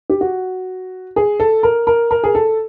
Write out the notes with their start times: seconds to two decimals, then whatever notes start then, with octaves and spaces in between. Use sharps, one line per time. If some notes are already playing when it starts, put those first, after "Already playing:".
0.10 G4
0.21 F#4
1.16 G#4
1.40 A4
1.63 A#4
1.87 A#4
2.11 A#4
2.24 G#4
2.35 A4